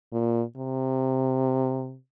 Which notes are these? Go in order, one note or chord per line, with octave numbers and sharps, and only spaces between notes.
A#2
C3